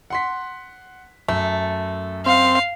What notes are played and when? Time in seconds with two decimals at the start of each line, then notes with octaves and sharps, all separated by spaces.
0.10 F#5 C6 B6
1.28 F#2 A3
2.26 C4 F5